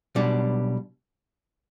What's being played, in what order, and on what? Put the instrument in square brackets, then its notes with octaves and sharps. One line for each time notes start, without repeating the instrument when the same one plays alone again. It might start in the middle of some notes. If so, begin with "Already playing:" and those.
[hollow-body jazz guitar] B1 B2 G3 D4